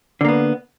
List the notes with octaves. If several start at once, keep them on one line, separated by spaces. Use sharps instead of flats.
D3 A#3 B3